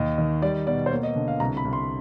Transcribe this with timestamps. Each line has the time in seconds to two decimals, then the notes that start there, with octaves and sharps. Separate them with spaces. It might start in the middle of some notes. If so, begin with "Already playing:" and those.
Already playing: D#2 D#5
0.18 D#3
0.42 G3 D5
0.67 B2 D5
0.86 C5
0.91 A#3 C#5
1.03 D#5
1.16 D3
1.28 F5
1.40 C2 A#5
1.57 B5
1.65 C2
1.73 C6